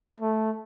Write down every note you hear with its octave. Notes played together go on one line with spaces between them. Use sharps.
A3